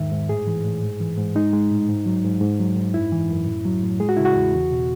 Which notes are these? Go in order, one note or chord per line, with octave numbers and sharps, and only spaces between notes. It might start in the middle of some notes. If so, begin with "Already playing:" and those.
Already playing: E2 G#2 D#3 E5
G#2
A2 G#4
E3
A2
G#2
E3
G#2
G#3 D#4
G#3
A2
G#2
F#3
G#2
G#2
F#3
G#2
F#2 E4
E3
F#2
A2
F#3
A2
G#3 G#4
F#4
C#3 E4
F#4
E2
E2
B2